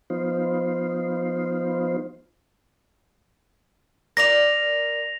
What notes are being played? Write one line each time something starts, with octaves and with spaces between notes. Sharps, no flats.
F3 B3 D#4 F4 C5
A#4 D5 F5 A#6 F7